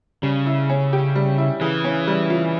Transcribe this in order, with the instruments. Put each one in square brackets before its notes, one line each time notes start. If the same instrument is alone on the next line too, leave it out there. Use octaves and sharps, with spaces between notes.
[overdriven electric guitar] C#3 [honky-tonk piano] G3
[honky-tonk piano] E4
C#4
G4
G3
E4
[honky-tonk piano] C#3 [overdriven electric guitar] E3
[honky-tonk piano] C#4
G3
F4